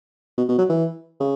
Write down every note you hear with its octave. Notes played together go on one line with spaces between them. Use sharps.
B2
B2
F#3
E3
C#3